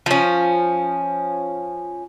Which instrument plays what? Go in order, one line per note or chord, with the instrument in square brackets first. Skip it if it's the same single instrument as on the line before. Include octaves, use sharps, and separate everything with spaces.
[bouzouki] F3 C#4